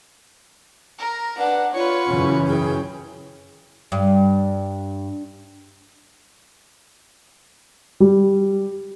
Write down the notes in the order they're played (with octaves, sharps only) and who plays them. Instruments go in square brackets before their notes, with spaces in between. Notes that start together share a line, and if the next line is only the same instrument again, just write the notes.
[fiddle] A#4 A#5
[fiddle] D4 [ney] B4 [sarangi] F#5
[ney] F4 [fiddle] B4 C#6 [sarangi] C#5
[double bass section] F#2 C#3 E3 [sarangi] C#4
[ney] G#4 [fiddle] G5
[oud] G2
[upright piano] G3